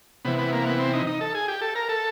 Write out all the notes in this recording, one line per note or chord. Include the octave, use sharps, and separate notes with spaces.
C3 E3 B3
B3
A#3
B3
C4
D#4
D#4
A4
G#4
G4
A4
A#4
A4